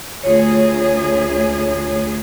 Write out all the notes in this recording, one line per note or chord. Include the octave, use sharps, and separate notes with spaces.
D2 F4 G#4 C#5